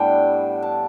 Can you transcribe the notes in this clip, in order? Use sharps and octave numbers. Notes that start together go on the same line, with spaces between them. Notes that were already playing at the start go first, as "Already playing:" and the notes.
Already playing: A2 G3 B3 D4 G5
A5